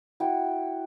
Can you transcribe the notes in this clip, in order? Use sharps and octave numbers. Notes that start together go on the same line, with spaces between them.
E4 F#4 G5